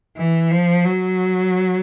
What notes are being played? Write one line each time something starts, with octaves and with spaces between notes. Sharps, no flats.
E3
F3
F#3